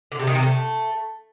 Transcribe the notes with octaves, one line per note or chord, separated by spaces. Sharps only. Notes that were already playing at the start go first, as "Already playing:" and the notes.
D3
C3
D#3
C3
A3